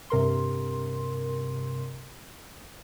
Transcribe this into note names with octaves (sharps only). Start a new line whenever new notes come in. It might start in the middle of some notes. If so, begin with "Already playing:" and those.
G2 C3 A#4 C6